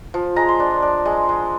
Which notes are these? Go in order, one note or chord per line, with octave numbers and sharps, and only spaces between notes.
F3
G#3 A#5
C6
D4
D4
G#3
G#3